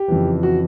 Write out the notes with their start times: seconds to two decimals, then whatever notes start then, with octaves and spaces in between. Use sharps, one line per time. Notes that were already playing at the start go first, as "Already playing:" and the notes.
Already playing: G4
0.08 F2 C#3 E3
0.43 F#4